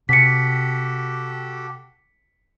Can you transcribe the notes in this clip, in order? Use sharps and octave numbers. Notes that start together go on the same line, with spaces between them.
C3 F#4 G4 A4 B6 C#7